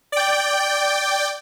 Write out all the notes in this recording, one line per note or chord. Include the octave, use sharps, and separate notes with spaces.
D5 G5